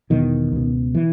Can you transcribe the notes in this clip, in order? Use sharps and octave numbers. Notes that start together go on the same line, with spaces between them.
E1 E2 B2 D#3
C#2 B2
E3